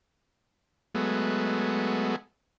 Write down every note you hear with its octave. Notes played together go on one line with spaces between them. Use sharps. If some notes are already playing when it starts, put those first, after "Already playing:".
F#3 G#3 A3 B3